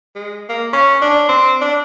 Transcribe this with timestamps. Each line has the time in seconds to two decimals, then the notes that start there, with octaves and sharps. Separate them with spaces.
0.16 G#3
0.49 A#3
0.73 C#4
1.02 D4
1.29 C4
1.61 D4